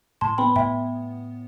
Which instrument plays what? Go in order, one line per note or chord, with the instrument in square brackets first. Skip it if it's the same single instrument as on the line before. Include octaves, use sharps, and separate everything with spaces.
[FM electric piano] A2 [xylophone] A5 C6
[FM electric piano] B3 [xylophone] G5 B5
[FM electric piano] A2 [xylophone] E5 G5